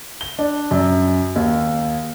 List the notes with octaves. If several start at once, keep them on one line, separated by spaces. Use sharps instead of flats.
G7
D4
F#2
D#2